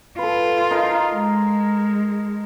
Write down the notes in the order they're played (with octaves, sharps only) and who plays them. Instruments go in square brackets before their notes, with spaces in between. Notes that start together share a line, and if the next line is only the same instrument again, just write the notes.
[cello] F4 [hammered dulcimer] A4 B4
[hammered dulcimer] D#4 A#4
[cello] G#3